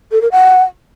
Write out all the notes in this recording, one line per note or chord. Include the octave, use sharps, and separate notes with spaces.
A4
A#4
F#5